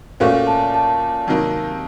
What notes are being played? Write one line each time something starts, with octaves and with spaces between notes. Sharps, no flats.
A#2 A3 C#4 F#4 F5
A5
A5
C3 D#3 F#3 A#3 D#4